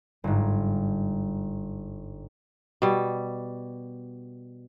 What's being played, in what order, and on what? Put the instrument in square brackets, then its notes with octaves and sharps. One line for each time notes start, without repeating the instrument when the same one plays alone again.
[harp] G1 G#2
[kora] B2 G3